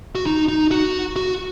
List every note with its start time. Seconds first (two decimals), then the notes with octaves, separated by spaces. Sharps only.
0.15 F#4
0.26 D#4
0.48 D#4
0.71 F#4
1.16 F#4